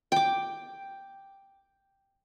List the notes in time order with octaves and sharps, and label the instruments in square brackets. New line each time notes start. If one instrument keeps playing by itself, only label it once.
[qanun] G5 D6